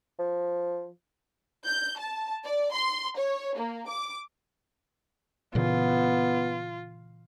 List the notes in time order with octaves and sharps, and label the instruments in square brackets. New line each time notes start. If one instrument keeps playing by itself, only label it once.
[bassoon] F3
[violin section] G6
A5
D5
C6
C#5
A#3
D6
[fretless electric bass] A#2 C#3 E3 [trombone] B3 [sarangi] F4